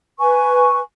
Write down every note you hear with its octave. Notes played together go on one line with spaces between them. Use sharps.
B4 G#5 C#6